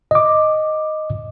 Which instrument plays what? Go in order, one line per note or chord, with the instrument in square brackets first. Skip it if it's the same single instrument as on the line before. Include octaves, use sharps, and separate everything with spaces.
[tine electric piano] D#5 D6